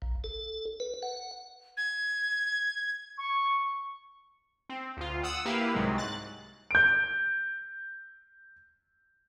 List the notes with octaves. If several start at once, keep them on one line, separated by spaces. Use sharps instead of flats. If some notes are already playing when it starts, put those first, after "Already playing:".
A#1
A4
B4
F#5
G#6
C#6
C4
D2 F4
F#5 D#6 E6
A#3 E4 G4 B4 F5
C2 G#2 C3 F#3 G#3
F#6 A6
G6 D7